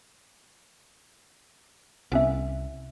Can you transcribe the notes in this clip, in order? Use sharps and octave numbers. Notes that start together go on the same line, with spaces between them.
C2 B3 C#4 E5